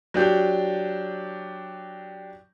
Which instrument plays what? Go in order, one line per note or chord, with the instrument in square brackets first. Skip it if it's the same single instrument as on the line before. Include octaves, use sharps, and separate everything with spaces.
[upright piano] F#3 D4 G4